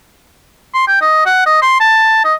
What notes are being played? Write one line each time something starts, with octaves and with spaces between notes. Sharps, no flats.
C6
G5
D#5
F#5
D#5
C6
A5
D#5